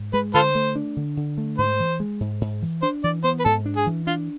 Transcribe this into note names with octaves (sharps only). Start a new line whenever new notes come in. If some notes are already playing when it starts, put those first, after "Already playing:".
Already playing: G#2
G#3 B4
D3 F4 A4 C5
A3
D4
D3
D3
A3
G#2 C5
E3
G#3
G#2
G#2
E3
D4 C5
E3 D5
B3 C5
B4
G#2 A4
D4
G#4
E3
D4 F4